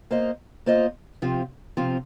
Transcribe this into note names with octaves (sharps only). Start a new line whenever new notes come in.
A#3 F4 C5 D#5
A#3 F4 C5 D#5
C3 F3 C4 F4
C3 F3 C4 F4